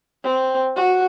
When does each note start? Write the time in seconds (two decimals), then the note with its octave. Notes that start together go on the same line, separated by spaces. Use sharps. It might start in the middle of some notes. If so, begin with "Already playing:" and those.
0.24 C4
0.76 F#4